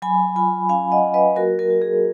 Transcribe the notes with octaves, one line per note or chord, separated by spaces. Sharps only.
F#3 G#5 B5
F4 G#5 B5
C#4 F5 G#5
D#5 F#5
F#3
B4 D#5
A#3 F#4 A#4
F#4 A#4
F#4
G#4